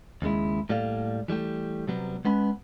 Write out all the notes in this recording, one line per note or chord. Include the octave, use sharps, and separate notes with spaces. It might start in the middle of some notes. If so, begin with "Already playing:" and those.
D#2 C#3 G#3 E4
A2 G3 A#3 A4 D5 F5
E3 G3 A3 G4
C3 F#3 G3 B3
G#3 B3 C#4 B5